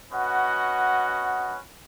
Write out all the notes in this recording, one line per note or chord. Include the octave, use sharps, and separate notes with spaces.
C#4 F#4 B4 D#5 F#5